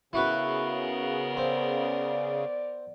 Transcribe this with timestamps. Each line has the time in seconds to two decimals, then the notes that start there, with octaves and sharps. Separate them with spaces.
0.13 C#3 B3 E4 F#4 A#4 B4
1.37 C4 D5